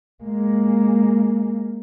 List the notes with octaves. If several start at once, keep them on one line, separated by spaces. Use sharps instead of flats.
G#3 A#3